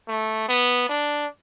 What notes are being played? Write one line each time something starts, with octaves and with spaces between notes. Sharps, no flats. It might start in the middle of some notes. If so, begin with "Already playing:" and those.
A3
B3
D4